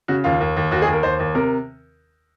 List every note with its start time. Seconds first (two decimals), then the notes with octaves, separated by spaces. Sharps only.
0.08 C#3 F#4
0.24 D#2 F4
0.40 D#2
0.57 D#2
0.71 D#2 F#4
0.82 G#4
0.88 D#2
0.93 A#4
1.03 D#2 C5
1.20 D#2
1.35 C3 A#4